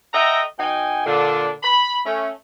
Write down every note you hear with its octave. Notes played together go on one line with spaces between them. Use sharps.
A4 D#5 E5 F#5 G5 A#5
B2 D#4 G5 G#5
A#2 D3 D4
B5
A3 C#4